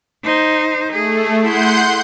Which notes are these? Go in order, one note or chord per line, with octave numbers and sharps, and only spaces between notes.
D#4 C5
A3 G#4
E4 G#4 F#5 C6 G6